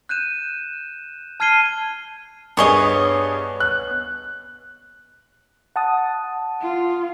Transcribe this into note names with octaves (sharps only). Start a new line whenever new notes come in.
F#6 G6 D#7 E7
A5 F6 G#6 C7 D#7 G7
G2 B3 G#4 C#5 D#5 G7
F#6
F#5 A5 D#6
F4